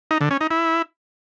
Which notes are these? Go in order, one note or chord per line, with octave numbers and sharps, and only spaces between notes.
D#4
D3
C#4
D#4
E4